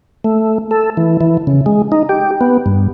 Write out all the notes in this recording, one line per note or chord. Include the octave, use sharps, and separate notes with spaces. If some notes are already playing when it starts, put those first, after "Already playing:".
A3
A4
E3
E3
C#3
G#3
D#4
G4
B3
G2